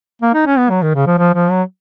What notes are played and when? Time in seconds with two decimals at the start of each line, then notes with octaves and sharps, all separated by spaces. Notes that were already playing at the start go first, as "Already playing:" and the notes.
0.22 A#3
0.34 D#4
0.46 C#4
0.58 B3
0.70 F#3
0.82 D#3
0.95 C#3
1.06 F3
1.18 F3
1.34 F3
1.51 F#3